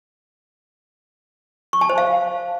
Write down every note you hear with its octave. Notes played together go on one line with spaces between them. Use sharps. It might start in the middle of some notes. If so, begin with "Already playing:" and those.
C#6
A5
C5
F5